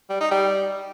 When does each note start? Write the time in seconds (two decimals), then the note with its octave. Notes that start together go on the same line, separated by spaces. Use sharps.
0.10 G3
0.20 D#4
0.31 G3